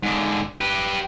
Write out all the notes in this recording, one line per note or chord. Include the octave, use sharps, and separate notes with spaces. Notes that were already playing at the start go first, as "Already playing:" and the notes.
G#2 D3
G4 B4